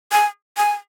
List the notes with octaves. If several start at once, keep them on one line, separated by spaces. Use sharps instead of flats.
G#5
G#5